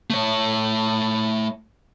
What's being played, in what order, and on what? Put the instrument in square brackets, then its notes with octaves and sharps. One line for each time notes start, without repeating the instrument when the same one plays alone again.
[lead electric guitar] A3 C#5